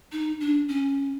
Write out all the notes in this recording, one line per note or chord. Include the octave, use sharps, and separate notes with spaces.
D#4
D4
C#4